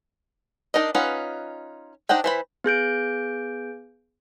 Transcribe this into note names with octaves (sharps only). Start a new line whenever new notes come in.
D4 D#4 A#4 D#5
C#4 D#4 F4 B4 F#5
D4 D#4 C5 F#5 G5
E3 C5 B5
B3 G#4 G6 D7